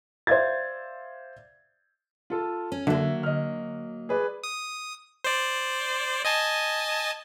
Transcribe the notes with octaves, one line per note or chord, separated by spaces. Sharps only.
C5 D5 E5 F5 G#6 A6
F4 A4
C#4
D3 F#3 A#3 E5
D#5 F6
G#4 B4 D5
D#6
C5 D5
D#5 G#5 A5